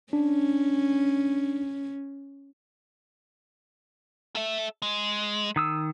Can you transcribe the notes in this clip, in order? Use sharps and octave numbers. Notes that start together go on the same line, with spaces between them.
C#4 D4
A4 E5
G#3
D#3 D#6 E6